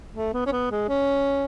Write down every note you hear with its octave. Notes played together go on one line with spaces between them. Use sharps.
A3
B3
C#4
B3
G#3
C#4